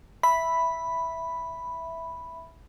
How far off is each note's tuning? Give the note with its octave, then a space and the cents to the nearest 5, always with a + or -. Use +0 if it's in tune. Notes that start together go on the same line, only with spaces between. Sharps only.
E5 +0 B5 +0